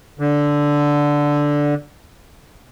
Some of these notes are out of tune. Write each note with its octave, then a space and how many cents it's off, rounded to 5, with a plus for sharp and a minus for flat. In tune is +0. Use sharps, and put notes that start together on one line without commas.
D3 -5